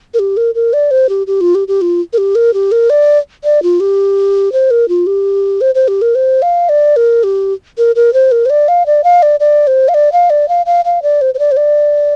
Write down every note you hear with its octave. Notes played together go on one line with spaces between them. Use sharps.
A#4
G4
A#4
A#4
D5
C5
G4
G4
F4
G4
G4
F4
A#4
G4
A#4
G4
A#4
D5
D5
F4
G4
C5
A#4
F4
G4
C5
C5
G4
A#4
C5
F5
D5
A#4
G4
A#4
A#4
C5
A#4
C5
D5
F5
D5
F5
D5
D5
C5
F5
D5
F5
D5
F5
F5
F5
D5
C5
C5
D5
C5
D5